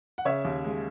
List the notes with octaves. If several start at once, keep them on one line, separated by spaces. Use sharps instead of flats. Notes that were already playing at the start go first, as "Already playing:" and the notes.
F#5
C#3 C#5 E5
D#2
G#3